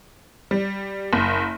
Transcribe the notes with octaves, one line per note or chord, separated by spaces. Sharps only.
G3
F#1